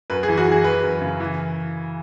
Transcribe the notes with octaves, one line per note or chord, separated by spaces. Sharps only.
F#2 B4
G#4
E3
F#4
E3 G#4
E3 B4
F#2
C#3
E3